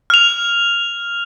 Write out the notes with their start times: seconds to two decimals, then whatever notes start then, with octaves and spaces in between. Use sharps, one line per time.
0.10 F6 F7